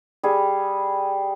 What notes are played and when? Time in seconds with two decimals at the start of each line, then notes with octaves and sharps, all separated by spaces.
0.23 G3 G#4